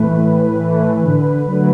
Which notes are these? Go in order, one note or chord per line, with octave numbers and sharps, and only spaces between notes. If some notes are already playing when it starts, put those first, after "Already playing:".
Already playing: A2 E3 A3 B4
A2
E3 A3
D3
F#3 A3